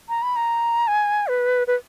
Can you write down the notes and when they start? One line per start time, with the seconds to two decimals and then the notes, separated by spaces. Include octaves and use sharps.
0.09 A#5
0.23 B5
0.36 A#5
0.88 G#5
1.28 B4
1.67 B4